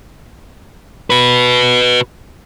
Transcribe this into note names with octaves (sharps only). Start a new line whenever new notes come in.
F#4 B4